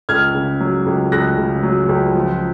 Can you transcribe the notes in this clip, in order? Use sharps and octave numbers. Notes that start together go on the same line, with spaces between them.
C#2 F6 G#6
C#3
F#3
C#2
C#2 F#6 A#6
C#3
F#3
C#2
F3